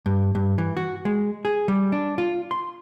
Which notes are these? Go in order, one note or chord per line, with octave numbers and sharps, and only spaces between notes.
G2
G2
E3
F#4
G#3
G#4
G3
D4
F4
C6